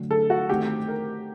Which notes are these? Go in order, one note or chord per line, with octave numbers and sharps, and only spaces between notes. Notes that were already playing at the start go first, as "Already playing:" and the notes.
Already playing: D3 F#3 A3 D4
A4
F#4
D#3 A3 C4 G4
A#4